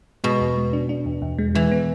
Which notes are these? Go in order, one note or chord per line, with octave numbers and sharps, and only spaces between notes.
B2 G#3
E2
G#3
D4
D4
E2
E2
G#3
E3 G#3
B3